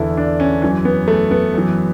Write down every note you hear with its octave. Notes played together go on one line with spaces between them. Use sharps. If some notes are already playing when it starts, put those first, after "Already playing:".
Already playing: E2 D3 E4
D4
C#4
F#2 E3 C#4
B3
A3
B3
F#2 E3